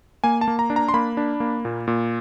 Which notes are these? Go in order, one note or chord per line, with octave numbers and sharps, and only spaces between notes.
A#3 G#5
A5
A#3
A#5
D4
A#5
C6
A#3 B5
D4
A#3
A#2
A#2